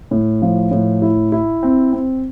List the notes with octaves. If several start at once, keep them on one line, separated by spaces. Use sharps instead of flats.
A2
F3
A2
E4
E4
C4
C4